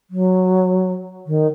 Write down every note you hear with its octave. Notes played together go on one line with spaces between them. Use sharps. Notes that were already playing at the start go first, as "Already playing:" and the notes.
F#3
D#3